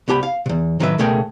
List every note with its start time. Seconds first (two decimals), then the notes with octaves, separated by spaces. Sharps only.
0.08 C2 B3 G4 G#5 B5
0.23 F5
0.46 E2 C3
0.80 A2 D#3 F#3 G#4 B4 E5
0.98 C#2 B2 A3 G#4 A#4 G5